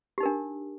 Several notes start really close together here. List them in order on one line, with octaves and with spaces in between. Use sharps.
G4 D#4 A#4 D4